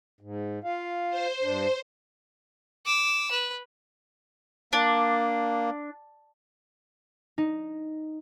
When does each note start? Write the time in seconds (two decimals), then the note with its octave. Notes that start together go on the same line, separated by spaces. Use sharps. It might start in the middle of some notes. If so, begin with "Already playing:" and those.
0.21 G#2
0.64 F4 F5
1.10 C5
1.42 G2 D4
2.85 D6 E6
3.31 B4
4.73 A#3 D4
7.38 D#4